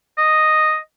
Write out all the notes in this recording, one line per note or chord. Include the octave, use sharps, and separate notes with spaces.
D#5